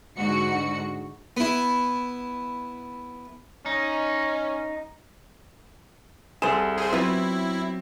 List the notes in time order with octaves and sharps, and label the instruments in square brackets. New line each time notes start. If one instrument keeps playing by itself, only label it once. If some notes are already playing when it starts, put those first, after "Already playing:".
[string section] G#2 D3 F#4 C#7
[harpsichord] B3 E4
[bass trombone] C#4 [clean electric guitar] D#4
[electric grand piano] C2 A4 E7 [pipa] G#4 C5
[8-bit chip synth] G#4 C5
[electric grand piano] F#3 C4 [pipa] B3 F4 [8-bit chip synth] E4